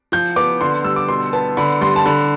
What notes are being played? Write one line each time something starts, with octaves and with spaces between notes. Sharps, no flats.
F3 G6
B3 D6
D3 C6
G3 E6
D6
B2 C6
B3 A5
D3 B5
G3 C6
A5
D3 B5